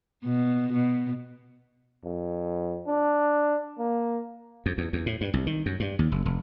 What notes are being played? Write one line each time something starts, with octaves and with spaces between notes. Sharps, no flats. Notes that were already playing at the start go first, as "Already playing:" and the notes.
B2
B2
F2
D4
A#3
F2
E2
E2
A2
G2
C2
D#3
F#2
G2
D#2
F#1
F1